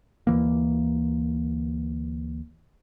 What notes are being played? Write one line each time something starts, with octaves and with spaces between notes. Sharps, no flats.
D2 E3 A#3